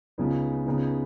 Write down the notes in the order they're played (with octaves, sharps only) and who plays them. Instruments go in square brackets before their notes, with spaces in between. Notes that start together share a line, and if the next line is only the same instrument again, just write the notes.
[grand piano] C#2 C#3 B3 D#4
C#2 C#3 B3 D#4